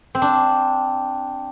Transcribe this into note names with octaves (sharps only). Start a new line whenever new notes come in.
C4
D4